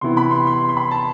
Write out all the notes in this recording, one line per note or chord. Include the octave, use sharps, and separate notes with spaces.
C3 E3 B3 E4 C6
B5
C6
C6
C6
B5
A5